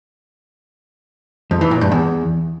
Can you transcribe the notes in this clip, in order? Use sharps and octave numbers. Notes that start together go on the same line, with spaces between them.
F2
E3
A#2
G2
E2